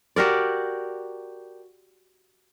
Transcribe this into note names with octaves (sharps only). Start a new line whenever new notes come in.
F#4 G4 A#4 D5